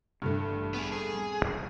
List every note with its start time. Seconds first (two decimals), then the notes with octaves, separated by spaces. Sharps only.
0.22 E1 G2 D3 A3
0.50 A1
0.74 B3 G#4
0.92 G#4
1.13 D#1 G3 C4
1.46 D#2 C3